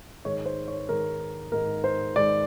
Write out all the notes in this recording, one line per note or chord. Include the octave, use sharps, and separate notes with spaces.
G#2 D#3 G#3 C#5
C5
C#5
G#2 D#3 G#3 A#4
G#2 D#3 G#3 A#4
C5
G#2 D#3 G#3 D5